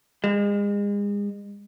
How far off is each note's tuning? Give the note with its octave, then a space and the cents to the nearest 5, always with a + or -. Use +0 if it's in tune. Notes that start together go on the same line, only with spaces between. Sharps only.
G#3 -35